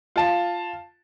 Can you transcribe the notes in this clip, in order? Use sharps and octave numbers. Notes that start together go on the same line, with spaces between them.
F4 A5